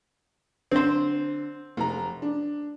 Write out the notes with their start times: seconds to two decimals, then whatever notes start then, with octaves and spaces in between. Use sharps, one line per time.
0.71 D3 C4 C5
1.77 F1 A#5
2.22 D4